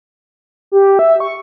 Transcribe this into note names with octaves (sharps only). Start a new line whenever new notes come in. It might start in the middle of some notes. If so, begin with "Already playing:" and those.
G4
E5
C#6